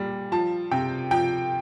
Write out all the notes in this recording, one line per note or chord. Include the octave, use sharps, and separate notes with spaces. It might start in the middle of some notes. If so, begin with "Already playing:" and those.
Already playing: A#2 G3
F3 A5
C3 G5
F3 G5